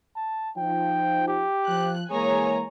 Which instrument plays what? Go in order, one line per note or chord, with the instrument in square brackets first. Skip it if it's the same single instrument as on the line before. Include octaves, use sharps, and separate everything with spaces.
[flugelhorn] A5
[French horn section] F3 D#4 [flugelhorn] G5
[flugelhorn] G4
[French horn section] F3 [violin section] F#6
[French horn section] E3 G#3 A#3 [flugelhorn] G#4 [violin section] C#5 G#5 A#5